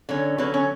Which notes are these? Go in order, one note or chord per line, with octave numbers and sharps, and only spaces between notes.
D3 F#3 C#4
D3 F#3 C#4 B4
C#4